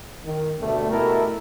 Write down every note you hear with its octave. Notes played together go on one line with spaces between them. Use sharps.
D#3
D2 B2 G3 A3
B2 A3 E4 G4 A4 A#4